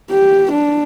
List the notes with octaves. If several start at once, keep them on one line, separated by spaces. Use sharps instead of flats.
G4
D4